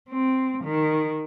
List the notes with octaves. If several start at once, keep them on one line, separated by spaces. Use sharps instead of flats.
C4
D#3